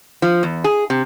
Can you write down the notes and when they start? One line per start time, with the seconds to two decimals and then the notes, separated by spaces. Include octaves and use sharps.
0.22 F3
0.43 E2
0.64 G#4
0.90 C3